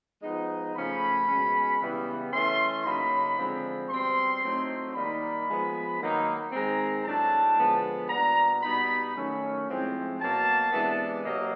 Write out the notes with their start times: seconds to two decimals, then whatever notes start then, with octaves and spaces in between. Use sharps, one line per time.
0.22 F3 G#3 B3 D#4
0.74 C#3 F3 A3 C#4 B5
1.27 B2 G#3 C#4
1.80 C#3 E3 G3 B3
2.32 E3 A3 C#4 C6
2.84 C#3 F#3 A#3 D#4 B5
3.37 D3 F3 G#3 C4
3.89 B2 G3 C4 C6
4.42 A2 F#3 A3 C4 D#4
4.95 D#3 G3 A#3 D#4 B5
5.48 F3 G#3 B3
5.99 D#3 F#3 A#3 D#4
6.52 D#3 G#3 C4 A#5
7.05 A2 F#3 A3 D4 A5
7.57 D3 F3 G#3 B3
8.09 A#2 G3 B3 D4 A#5
8.62 B2 G3 B3 D#4 B5
9.14 D#3 F#3 A3 C#4
9.67 A2 F3 G#3 C4
10.19 B2 F#3 A#3 A5
10.72 C3 E3 G#3 B3 D4
11.24 C3 F#3 A#3 D#5